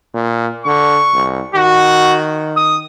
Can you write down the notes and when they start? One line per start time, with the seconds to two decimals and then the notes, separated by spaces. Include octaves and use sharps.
0.14 A#2
0.66 D3 C#6
1.13 C2
1.55 D#3 F#4
2.57 D#6